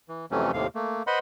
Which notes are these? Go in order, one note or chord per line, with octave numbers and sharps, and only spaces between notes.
E3
F2 C3 E3 F#3 A3 C#4
D#2 A2 C3 F5
A3 A#3
B4 C5 D#5 F#5 B5 C6